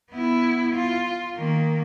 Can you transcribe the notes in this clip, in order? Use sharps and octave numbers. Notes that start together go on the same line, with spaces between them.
B3 E4
F4
D#3 A#3